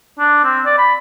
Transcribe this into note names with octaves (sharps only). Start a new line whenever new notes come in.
D4
C4
D5
B5